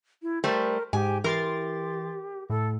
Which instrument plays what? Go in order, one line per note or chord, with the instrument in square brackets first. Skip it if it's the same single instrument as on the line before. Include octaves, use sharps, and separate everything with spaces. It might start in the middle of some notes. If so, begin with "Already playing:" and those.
[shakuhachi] E4
[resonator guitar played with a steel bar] G3 A3 C5 [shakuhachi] A#4
[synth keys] G#2 [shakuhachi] G4 [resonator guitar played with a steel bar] G#5
[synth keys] E3 C6 A6 [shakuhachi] G4 [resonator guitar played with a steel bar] A#4
[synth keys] A2 [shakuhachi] A4